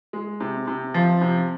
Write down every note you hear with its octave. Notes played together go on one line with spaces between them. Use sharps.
G#3
C3
C3
F3
C3